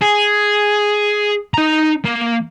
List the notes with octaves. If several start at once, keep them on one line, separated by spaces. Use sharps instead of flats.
G#4
D#4 A#5
A#3